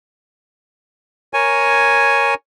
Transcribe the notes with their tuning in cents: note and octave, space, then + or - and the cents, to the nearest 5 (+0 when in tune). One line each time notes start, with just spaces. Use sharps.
A#4 +0 C#5 +0 G#5 +0